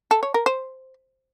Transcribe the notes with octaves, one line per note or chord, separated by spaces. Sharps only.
A4
C#5
A#4
C5